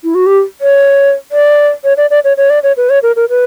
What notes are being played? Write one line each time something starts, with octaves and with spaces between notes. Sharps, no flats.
E4
F#4
G4
C#5
D5
C#5
D5
D5
C#5
C#5
D5
C#5
B4
C#5
A#4
A#4
B4